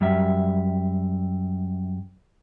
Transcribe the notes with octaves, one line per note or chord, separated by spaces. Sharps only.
F#2 G3 E5